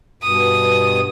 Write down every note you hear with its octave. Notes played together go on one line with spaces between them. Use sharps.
G2 B2 D#6